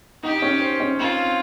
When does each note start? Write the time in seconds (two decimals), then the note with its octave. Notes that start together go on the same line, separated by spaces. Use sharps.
0.23 D#4 G4
0.42 C#4
0.62 C5
0.80 C#4
0.99 C4 F4